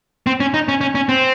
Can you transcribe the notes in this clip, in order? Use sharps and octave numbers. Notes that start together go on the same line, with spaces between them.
C4
C#4
D#4
C#4
C#4
C#4
C4